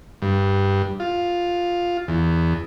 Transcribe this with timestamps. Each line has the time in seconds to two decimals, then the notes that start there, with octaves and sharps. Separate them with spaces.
0.22 G2
1.00 F4
2.08 E2